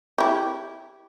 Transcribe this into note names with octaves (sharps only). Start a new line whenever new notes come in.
E4 G4